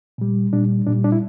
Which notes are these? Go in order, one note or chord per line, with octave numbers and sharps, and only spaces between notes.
A#2 G3
A#2 G3 D4
A#2 G3 D4
D4
E4